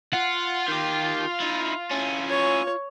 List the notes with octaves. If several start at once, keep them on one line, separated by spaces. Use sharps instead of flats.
F4 F#5
D#3 G4
D#4 E4
C#4 E4
C#5